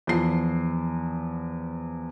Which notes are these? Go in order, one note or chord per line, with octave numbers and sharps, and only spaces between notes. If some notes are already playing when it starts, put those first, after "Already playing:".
E2 F3 C7